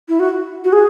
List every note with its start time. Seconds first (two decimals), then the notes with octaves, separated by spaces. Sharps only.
0.09 E4
0.20 F#4
0.64 F#4
0.73 G#4